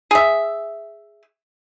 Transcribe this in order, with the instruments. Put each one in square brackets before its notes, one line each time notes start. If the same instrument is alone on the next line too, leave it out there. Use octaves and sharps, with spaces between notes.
[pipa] G#4 E5